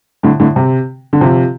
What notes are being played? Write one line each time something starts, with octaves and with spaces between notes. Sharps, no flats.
A2 D3
A2 D3
C3
D3
C3 F3